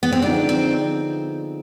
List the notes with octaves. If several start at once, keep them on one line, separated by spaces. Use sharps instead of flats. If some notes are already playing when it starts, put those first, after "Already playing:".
B3
C4
D3 F3 B3 D4 D#4 G#4
C4